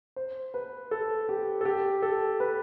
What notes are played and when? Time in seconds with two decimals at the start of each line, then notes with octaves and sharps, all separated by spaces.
0.16 C5
0.54 B4
0.91 A4
1.29 G4
1.61 A4
1.65 G4
2.02 A4
2.40 B4